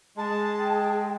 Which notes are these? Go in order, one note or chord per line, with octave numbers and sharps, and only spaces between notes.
G#3 G#4 A5
G5